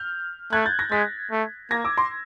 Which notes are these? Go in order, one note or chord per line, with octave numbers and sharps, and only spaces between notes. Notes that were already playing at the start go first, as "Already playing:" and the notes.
Already playing: F6 G6
A3 F#6 G#6
G6 A6
G#6 A#6
G#3 A6 B6
A3
A#3 G#6 A#6
D6 E6
C6 D6